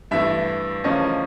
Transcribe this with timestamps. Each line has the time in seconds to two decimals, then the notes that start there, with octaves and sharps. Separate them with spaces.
0.11 G2 E3 A3 E5
0.84 E2 C#3 F3 A3 C#4 D#5